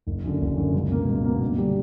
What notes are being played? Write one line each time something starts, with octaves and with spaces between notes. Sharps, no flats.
F#1
F#2 D3
F#1
F#2 D3
C#2
B2 A#3
C#2
B2 A#3
G2
D3 G3